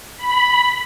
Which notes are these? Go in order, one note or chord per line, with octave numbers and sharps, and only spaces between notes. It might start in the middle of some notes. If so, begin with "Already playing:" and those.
B5